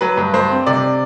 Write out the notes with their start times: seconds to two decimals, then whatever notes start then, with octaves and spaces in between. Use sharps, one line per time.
0.01 F#3 B4
0.17 G2
0.34 G2 C5
0.50 C4
0.67 C3 D5